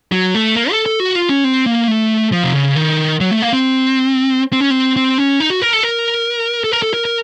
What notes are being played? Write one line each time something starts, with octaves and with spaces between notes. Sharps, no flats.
F#3
A3
A#3
A4
A4
F#4
F4
C#4
C4
A#3
A3
F3
C3
C#3
D#3
F#3
A3
A#3
C4
C4
C#4
C4
C4
C#4
D#4
F#4
A#4
A4
A#4
A4
A#4
A4
A#4
A#4